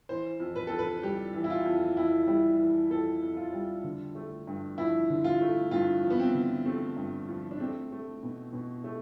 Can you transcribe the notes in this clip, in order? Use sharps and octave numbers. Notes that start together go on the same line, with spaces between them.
E3 C5
F2
B4
F2 A4
B4
G3 G4
E3
E4
F4
F2
F2 E4
G3 E4
E3
F2 A4
F2
F4
G3
D3
A3
G2
F3 E4
D3
F4
A3
G2 F4
F3
B3
C4
D3
A3 C4
G2
F3
D4
A3 C4
A3
B2
B2
A3